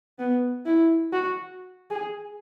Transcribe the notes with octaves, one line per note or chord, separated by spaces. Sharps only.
B3
E4
F#4
G#4